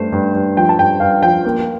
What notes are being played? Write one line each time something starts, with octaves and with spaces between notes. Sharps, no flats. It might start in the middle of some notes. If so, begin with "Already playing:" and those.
Already playing: G2 A3 C5
G2
G2
F3 G5
A5
G2 G5
G2 F5
F3 G5
A#3